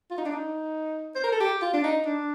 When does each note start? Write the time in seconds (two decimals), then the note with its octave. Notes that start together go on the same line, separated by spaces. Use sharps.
0.11 F4
0.18 D#4
0.25 D4
0.33 D#4
1.15 C5
1.24 A#4
1.32 A4
1.40 G4
1.62 F4
1.74 D4
1.84 D#4
2.06 D4